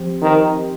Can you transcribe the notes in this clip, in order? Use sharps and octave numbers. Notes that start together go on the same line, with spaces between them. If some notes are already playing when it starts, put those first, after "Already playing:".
Already playing: F3 C4 G4 C5
D#3